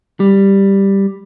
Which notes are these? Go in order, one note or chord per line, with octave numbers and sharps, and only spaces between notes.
G3